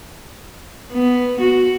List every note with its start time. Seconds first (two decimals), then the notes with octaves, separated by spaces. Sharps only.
0.93 B3
1.41 F#4